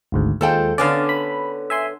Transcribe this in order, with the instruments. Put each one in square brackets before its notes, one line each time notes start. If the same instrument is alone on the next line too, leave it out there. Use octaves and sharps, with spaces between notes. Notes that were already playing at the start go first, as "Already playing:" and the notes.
[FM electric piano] G#1 D2 G#2
[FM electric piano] D#2 G#3 F4 [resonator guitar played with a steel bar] A4 C5 G5
[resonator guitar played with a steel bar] D3 B3 C#4 [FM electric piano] D5 F5
[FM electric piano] B5
E5 G#5 C6